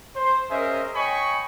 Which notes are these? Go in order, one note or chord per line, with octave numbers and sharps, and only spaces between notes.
C5
C#4 G#4 A#4 C5 D#5 E5
C#5 D#5 G5 G#5 B5 C#6